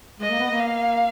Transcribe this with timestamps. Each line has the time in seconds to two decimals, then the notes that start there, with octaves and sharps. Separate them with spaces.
0.20 G#3 D#5
0.30 A#3
0.39 B3
0.50 A#3
0.59 F5